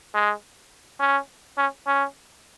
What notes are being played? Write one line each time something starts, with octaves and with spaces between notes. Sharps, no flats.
G#3
C#4
C#4
C#4